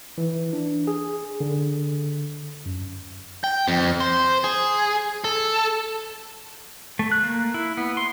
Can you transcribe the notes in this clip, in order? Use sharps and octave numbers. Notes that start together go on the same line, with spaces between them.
E3
D4
G#4
D3
F#2
G5
F2
C5
G#4
A4
A3
F#6
A#3
E4
B3
C6